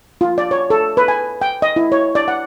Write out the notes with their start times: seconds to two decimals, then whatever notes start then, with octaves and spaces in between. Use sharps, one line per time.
0.21 F4
0.38 D5
0.51 C#5
0.70 A4
0.97 B4
1.08 G#5
1.41 G5
1.62 D#5
1.76 E4
1.92 C#5
2.15 D5
2.28 F#5